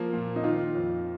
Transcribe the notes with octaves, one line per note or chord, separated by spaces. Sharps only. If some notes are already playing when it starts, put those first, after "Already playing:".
Already playing: F3 A#3
A#2
D#4
D#3 F4
F2